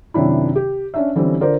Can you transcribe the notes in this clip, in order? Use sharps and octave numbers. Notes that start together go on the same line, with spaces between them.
F#2 C3 D#3 D4 E4
G4
C#4 D4 E5
D3 E3 G3 C4 C#4
D3 F4 A#4 C5 D5